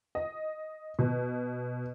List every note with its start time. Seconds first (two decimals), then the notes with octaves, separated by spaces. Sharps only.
0.15 D#5
0.99 B2